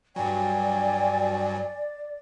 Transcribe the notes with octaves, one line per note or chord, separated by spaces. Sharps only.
G2 F#3 D5 G5 G#5